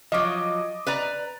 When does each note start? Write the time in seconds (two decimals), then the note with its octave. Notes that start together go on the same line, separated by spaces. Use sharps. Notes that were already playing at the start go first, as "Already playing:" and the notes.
0.12 F3 F#3 D#5 D6
0.87 B4 D5 A#5